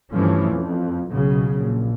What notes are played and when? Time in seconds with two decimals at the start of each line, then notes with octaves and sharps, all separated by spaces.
0.12 G2 E3 F3 A3 C#4
0.52 F2
1.10 B1 C#3 F#3
1.60 A#1